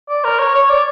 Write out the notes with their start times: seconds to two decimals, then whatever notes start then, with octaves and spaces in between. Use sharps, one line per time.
0.09 D5
0.24 A#4
0.39 C#5
0.54 C#5
0.69 D5